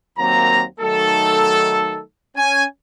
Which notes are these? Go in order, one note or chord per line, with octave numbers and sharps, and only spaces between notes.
D#2 F#3 A#3 C4 A#5
D#3 F#3 A3 D#4 A4
C#4 G#5